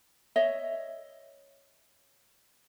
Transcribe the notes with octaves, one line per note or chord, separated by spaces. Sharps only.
C#5 D#5 E5